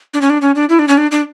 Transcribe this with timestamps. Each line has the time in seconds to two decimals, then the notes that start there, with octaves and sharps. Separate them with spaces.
0.14 D4
0.21 C#4
0.30 D4
0.42 C#4
0.55 D4
0.69 E4
0.79 D4
0.88 C#4
0.98 D4
1.11 D4